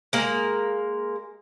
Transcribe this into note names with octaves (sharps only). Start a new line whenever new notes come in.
G#3 A#3